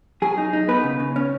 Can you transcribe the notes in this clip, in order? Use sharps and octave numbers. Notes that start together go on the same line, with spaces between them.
F#3 G#4
D#4
D#4
B3 B4
C#3
C#3
C#4